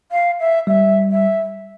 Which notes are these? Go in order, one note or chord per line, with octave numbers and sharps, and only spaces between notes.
F5
E5
G3 E5
E5